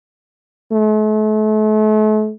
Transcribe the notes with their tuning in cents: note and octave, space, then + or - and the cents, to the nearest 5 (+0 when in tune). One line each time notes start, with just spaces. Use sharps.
A3 -40